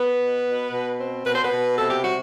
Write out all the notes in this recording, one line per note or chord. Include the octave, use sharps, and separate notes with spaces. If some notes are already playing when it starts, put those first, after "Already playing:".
Already playing: B3 B4
B2
B2
B2
C4
B2 B4
C5
B3 B4
B2
C3 A4
G4
G3 F#4